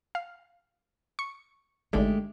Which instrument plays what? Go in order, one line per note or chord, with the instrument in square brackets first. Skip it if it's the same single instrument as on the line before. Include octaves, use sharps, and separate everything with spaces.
[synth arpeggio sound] F5
C#6
[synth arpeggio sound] G#1 D3 [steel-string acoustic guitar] G#3 A3 G4